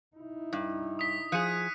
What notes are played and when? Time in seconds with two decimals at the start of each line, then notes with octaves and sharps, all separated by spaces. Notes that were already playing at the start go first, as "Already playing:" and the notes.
0.16 D#4 E4
0.53 G2
0.99 D#6 B6
1.32 F3 G#4 F#6 C#7 D#7